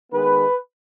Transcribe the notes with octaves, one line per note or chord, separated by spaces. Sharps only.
D#3 G#3 B3 B4